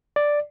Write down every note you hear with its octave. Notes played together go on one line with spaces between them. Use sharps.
D5